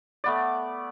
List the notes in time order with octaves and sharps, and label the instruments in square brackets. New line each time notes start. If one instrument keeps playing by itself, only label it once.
[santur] A3 B3 D5